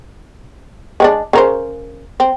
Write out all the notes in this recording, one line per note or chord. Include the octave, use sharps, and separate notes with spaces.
G#3 C4 D4
C#3 A#4 C5
C4